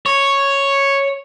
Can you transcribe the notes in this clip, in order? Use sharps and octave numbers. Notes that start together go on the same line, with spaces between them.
C#5